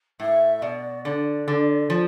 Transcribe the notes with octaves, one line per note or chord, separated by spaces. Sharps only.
A2 E5
B2 D5
D3 D5
D3
F3